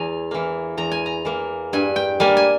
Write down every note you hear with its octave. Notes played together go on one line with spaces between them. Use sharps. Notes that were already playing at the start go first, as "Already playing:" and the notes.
Already playing: E2 G#5 A#5
E3 A#3
E2 A#5
G#5
A#5
E3 A#3
G2 G#5
G5
G3 A#3 G#5
G#5